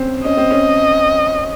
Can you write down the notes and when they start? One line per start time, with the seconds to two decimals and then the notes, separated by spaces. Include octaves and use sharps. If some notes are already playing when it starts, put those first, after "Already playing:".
Already playing: C4 C#4
0.24 C#4 D#5
0.37 C4
0.51 C#4